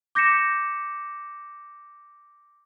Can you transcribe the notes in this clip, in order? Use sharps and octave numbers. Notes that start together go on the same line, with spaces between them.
D6 G6 A#6 B6 C#7 E7